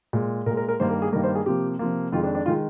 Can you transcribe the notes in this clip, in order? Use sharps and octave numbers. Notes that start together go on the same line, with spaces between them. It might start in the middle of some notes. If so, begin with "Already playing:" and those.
A#2 G#3
A#2 G#3 A#4
A#4
A#4
G2 D#3 A#3 C5
A#4
G#4
G2 D#3 A#3 A#4
C5
G#4
C3 F3 A#3 G4
C3 F3 A#3
F2 D#3 G#3 F4
D4
D4
D#3 G#3 F4